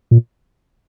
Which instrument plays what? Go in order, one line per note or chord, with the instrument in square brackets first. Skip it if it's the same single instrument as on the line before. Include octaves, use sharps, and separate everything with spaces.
[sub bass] A#2